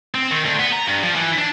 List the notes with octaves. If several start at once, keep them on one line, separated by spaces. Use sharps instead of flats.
C4
D#3
D2
B3
A#5
G2
F3
E3
D4